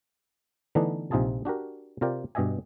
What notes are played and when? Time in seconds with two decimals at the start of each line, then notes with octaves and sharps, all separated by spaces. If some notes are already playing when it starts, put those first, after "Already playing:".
0.75 D3 E3 A3 B3 D4 D#4
1.11 A#1 C3 D#4 F4 G#4 A5
1.45 D4 F#4 G4 A#4
2.01 C3 F4 A#4 D5 G5
2.35 G2 B2 G4 D#5 E5 G#5